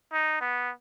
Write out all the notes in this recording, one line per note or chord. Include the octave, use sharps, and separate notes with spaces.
D#4
B3